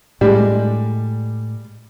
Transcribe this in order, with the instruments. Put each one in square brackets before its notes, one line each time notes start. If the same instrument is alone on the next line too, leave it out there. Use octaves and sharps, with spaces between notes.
[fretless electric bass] A2 G#3 [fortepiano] G3 D4